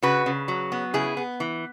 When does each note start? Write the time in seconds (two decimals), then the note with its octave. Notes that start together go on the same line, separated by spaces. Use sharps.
0.02 C#3 F#4 B4
0.26 C#3
0.48 F#3
0.72 B3
0.94 C#3 E4 G#4
1.17 B3
1.40 E3